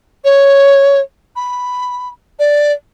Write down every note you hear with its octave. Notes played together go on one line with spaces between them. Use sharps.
C#5
B5
D5